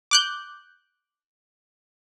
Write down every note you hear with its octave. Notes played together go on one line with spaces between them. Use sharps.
D6 F#6 G6